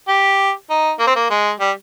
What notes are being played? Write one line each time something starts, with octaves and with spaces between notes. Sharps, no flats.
G4
D#4
A#3
C4
A#3
G#3
G3